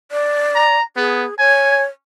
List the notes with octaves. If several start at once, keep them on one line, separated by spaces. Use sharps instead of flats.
D5
A#5
B3 G#4
C#5 G#5